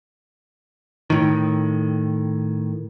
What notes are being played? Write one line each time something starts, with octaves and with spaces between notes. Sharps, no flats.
A2 D#3